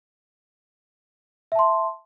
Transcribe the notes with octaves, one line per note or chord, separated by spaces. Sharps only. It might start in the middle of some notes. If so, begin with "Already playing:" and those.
E5 A5 C6